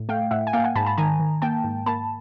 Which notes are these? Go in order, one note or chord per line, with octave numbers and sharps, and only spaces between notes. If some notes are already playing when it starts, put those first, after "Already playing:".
Already playing: A2
A3 F5 G5
A2 E5 F#5
G#5
A#3 F5 G5
F#5 G#5
G#2 A5 B5
A5 B5
D#3 G#5 A#5
D#3
A#3 G5 A5
G#2
A#3 A5 B5